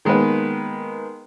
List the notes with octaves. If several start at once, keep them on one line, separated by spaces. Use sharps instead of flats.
D#3 G#3 A#3 B3 B4